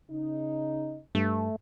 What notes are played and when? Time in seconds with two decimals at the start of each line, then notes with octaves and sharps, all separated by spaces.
0.10 C#3 D#4
1.15 G2 A3